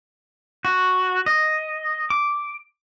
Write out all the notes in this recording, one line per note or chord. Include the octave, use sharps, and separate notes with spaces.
F#4
D#5
D6